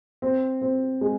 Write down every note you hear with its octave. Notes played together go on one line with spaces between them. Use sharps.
C4
C4
G#3